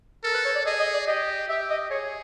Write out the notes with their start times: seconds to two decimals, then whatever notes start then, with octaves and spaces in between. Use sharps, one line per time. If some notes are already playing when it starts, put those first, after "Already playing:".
0.24 A4 A#4
0.34 B4
0.45 C#5
0.55 D5
0.66 G#4 D#5
0.79 D#5
0.94 D5
1.07 G4 D#5
1.48 G4 E5
1.70 D#5
1.90 G#4 C#5